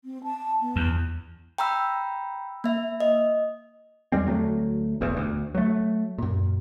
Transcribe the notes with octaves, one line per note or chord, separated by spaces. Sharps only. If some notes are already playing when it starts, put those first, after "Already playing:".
C4
A5
B3
E2
G5 A#5 B5 E6
A#3 E5
D#5
E2 G3 G#3 C4
D2 F#3 A3
E1 A1 E2
D2
F#3 A3
F#2 A#2